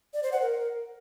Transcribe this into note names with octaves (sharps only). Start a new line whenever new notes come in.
D5
C5
F#5
A#4